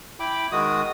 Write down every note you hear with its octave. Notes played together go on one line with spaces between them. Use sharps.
E4 G5 B5 D6
D#3 G#3 F#4 D#6